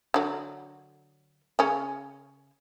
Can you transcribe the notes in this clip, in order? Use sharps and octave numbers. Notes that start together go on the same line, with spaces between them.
D3 F#3
C#3 C#4